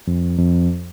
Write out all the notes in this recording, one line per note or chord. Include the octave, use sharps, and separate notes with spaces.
F2
F2